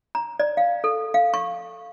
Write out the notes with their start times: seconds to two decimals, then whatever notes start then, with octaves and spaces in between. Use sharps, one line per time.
0.15 A#5
0.39 D5
0.57 F5
0.84 A4
1.14 F5
1.34 C#6